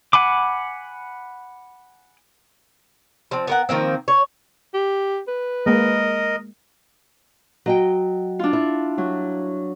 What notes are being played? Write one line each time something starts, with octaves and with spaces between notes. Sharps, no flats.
F#5 G#5 B5 D6
F3 C4
B3 A#4 F#5
D#3 F3 A#3 C4
C#5
G4
B4
G#3 A#3 A#4 D#5
F#3 D#5 G5
D4 F4
E4
F#3